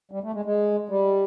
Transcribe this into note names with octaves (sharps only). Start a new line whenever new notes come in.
G3
A3
G#3
G#3
G3